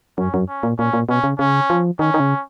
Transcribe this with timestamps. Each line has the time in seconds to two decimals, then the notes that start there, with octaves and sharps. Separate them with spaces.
0.18 F#2 C#4
0.34 F#2
0.48 C#4
0.63 A#2
0.78 A#2 C#4
0.93 A#2
1.09 B2 C#4
1.24 C#3
1.39 C#3 C#4
1.70 F3
1.99 D#3 C#4
2.14 D#3
2.20 C#3